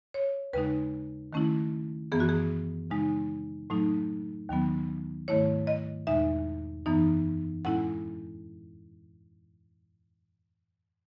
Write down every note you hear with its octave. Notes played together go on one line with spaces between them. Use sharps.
C#5
D#2 C#3 G#3 D#4 B4
D#3 A3 C#4 E4
F#2 E3 B3 G#4
F#4
G#4
C#3 G#3 D#4
A2 F#3 A3 D#4
D#2 D#3 F#3 B3
G#2 D#3 A3 E4 C#5
D#5
E2 B2 G#3 D#4 E5
F#2 E3 B3 D#4
A2 G#3 C#4 E4 F#5